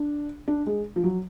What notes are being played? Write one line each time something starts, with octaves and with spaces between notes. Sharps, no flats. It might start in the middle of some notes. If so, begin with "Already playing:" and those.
Already playing: D4
D4
G#3
F3
F#3